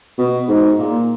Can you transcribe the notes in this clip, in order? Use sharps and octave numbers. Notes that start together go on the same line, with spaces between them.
B2
G#2
A#2